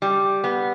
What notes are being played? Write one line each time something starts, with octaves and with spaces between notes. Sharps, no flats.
G3
B3